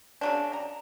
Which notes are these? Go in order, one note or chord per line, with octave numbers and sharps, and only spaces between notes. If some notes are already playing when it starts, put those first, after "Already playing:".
C#3 F#3 D4
A#5